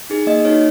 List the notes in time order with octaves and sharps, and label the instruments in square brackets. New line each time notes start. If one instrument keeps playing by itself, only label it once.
[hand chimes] D#4 G#4
A#3 D#5
D#4 F#4 C#5